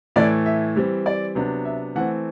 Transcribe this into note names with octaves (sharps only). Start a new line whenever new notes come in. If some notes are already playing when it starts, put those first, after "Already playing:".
A2 E3 A3 D5
E5
E3 G3 C4
D5
C3 F#3 B3 D4
E5
E3 A3 C4 F#5